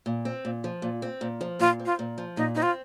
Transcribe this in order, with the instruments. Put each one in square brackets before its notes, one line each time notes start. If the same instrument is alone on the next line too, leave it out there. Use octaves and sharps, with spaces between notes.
[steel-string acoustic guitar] A#2
C4
A#2
F3
A#2
C4
A#2
F3
[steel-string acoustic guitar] A#2 [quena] F4
[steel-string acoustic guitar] C4
[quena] F4
[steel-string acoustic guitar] A#2
F3
[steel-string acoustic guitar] A#2 [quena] D#4
[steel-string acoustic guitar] C4 [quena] D#4
[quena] F4